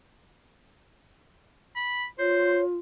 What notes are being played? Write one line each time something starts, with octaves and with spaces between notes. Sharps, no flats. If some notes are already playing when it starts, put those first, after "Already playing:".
B5
F4 C5 C#5